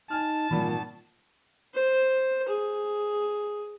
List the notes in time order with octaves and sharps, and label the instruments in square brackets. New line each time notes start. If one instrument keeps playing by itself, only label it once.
[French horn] D#4 [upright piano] G#5 F6 [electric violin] A5
[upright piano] G#1 B5 [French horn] A#2 [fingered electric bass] E3 F3 G3
[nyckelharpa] C5
G#4